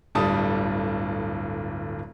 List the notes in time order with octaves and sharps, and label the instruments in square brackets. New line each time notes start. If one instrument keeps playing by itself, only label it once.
[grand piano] D1 G1 G3 D4 A5 D#6